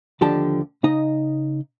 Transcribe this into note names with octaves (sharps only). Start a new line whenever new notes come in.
D#2 D3 F3 G4 D5 A5
C#3 D#4 D#5